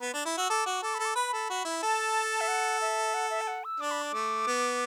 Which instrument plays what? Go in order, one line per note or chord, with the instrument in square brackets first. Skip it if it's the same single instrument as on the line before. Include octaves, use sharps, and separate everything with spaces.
[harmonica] B3
D4
E4
[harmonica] F#4 [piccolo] E6
[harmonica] A4 [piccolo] D6
[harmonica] F#4
[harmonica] A4 [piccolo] D6
[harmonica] A4 [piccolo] B5
[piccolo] D6
[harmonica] B4 [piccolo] B5
[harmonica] A4
F#4
E4
[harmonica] A4 [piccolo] A5
[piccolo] E5
F#5
E5
F#5
E5
A5
F#5
E6
[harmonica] D4 [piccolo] D6
[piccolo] B5
D6
[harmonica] A3
B3